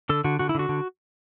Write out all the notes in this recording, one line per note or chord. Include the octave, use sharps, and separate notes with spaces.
D3 A4
D3 F#4
D3 F#4
E4
D3 F#4
D3